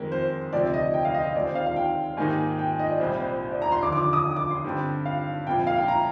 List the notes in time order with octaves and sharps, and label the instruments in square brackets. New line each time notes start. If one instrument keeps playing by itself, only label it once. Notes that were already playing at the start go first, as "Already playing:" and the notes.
Already playing: [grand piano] F2 D#3 G#3 [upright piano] A#4
[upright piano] C5
[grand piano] D2 C3 F3 C4 G4 [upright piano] D5
[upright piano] D#5
G5
F5
D#5
D#5
[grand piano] D#2 D#3 G#3 C4 G4 [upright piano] D5
[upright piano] C5
F5
F5
G5
[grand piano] G#2 D#3 A#3 D#4 G4 [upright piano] G#5
[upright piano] G5
D#5
D5
[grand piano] C2 A#2 G3 [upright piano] C5
[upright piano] C5
C5
D5
A#5
C6
[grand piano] D#2 D3 F3 [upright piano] D6
[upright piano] D6
D6
D#6
D6
C6
[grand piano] G2 D3 G3 C4
[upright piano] F5
[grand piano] C2 A#2 F3 [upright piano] G5
[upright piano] F5
G5
A#5